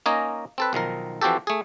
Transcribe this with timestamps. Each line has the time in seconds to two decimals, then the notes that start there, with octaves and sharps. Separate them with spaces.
0.06 A#3 C#4 D#4 D#5 G#5 A#5
0.58 C4 A4 B4
0.73 B1 D#3 F3 A#4
1.21 E3 F3 C4 F#4 G4 A4
1.47 A3 G#4